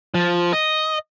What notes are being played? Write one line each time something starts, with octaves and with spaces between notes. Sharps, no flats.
F3
D#5